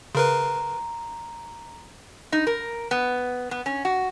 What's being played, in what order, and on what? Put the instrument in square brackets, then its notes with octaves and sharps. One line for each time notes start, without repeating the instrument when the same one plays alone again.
[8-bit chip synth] C#3 A#4 B4 [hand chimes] A#5 C6
[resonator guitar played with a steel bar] D#4
A#4
B3
B3
C#4
F#4